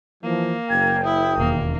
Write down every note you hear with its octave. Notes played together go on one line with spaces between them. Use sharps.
E3 F3 A#3
F#1 G5 G#6
E4 D#6
E1 D#2 A#3